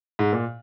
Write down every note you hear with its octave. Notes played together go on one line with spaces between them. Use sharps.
G#2
A#2